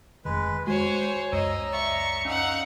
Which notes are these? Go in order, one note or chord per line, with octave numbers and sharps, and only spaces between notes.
F1 F2 D#3 G#3 B4
G#3 F#4 C5 C#5 G#5
C#2 F#2 C#5 D#5 A#5 E6
D5 E5 C#6
C#4 D#4 F5 F#5 E6